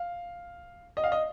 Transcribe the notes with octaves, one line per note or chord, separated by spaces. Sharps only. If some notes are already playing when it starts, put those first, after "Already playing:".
Already playing: F5
D#5
F5
D#5